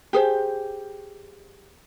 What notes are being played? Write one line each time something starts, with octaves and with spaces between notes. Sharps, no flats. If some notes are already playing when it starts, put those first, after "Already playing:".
G4 G#4 C5